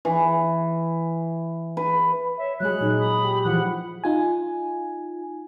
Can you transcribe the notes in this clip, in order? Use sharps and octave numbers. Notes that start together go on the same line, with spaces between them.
E3
B4
C#5 E5
F#3 G#3 G#4 C#5 B5 F#6
A#2 F#3 D#4
B5 D#6
G4
E3 F3 F#5 B5 F#6
D#4 F4 G#5